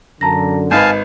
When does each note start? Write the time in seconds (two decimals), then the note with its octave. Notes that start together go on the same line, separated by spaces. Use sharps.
0.21 F#2 D3 A5 A#5 A#6
0.71 G#1 D#4 B4 F5 G#5 A5 G6